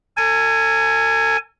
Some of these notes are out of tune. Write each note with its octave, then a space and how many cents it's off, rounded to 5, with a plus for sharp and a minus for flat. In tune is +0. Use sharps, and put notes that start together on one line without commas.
A4 +40 G#5 +0